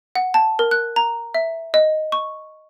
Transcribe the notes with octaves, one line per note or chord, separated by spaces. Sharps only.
F#5
A5
A#4
F#6
A#5
E5
D#5
C#6